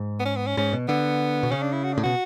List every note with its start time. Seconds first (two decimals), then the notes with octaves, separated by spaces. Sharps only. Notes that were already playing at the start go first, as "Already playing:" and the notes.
Already playing: G#2
0.20 B3
0.26 C#4
0.37 B3
0.47 C#4
0.57 G#2 C#4
0.73 B2
0.88 D3 B3
1.43 B2
1.51 C#3 C#4
1.62 D4
1.73 E4
1.84 F#4
1.93 A2 D4
2.03 B2 F#4